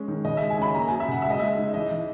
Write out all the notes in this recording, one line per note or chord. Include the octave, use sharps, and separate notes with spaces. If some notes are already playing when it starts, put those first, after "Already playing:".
Already playing: G#3 C#4
D#3
C#3 D#5
G#3 E5
G#5
C#4 B5
A#3 A#5
F#3 G#5
E5
C#3 F#5
G#3 E5
D#5
G#3 E5
D#4
E3 D#5
E3